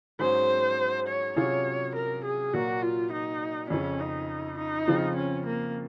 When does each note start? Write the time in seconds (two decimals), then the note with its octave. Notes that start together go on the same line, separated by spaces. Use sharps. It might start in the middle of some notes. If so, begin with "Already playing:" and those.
0.19 G#2 F#3 C#4 G#4 C5
1.08 C#5
1.36 C3 F#3 C#4 F4 G#4 C#5
1.95 A#4
2.25 G#4
2.53 A#2 F#3 A#3 F#4
2.82 F4
3.12 D#4
3.70 F2 C#3 F3 C#4
4.00 D#4
4.58 D#4
4.87 C#3 F3 C4 F4
5.16 C#4
5.46 A#3